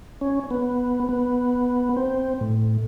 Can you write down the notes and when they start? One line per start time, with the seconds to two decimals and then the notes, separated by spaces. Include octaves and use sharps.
0.21 C#4
0.51 B3
1.09 B3
1.97 C4
2.41 A2